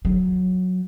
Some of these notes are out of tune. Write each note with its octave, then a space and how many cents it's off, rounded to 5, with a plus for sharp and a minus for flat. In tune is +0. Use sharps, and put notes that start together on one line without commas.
F#3 -10